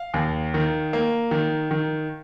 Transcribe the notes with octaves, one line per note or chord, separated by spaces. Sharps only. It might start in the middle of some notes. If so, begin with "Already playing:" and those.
Already playing: F5
D#2
D#3
A#3
D#3
D#3